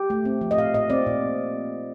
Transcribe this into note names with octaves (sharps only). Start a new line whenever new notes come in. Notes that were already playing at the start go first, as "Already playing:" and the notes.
Already playing: G4
A3
C4
F3
D#5
A#2 F5
A#2 D#5
C4 D5
A#2